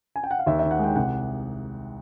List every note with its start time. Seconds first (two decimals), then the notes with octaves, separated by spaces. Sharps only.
0.16 G#5
0.24 G5
0.31 F#5
0.39 F5
0.46 D#2 E5
0.59 D#3 E5
0.71 F#5
0.79 G#3 G5
0.96 C2 F#5